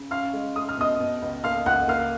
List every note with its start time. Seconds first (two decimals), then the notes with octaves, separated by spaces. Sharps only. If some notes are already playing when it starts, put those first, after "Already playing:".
Already playing: C#3
0.11 C#4 F5 F6
0.33 G#3
0.56 G#3 D#6
0.69 F6
0.78 B2 D#5 D#6
1.00 B2
1.22 C#2
1.44 A#3 F5 F6
1.66 C#2 F#5 F#6
1.88 A#3 F5 F6